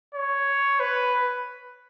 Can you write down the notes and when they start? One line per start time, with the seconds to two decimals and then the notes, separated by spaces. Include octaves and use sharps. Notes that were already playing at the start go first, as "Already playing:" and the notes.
0.15 C#5
0.80 B4